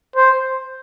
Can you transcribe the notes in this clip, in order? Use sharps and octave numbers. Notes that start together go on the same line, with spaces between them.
C5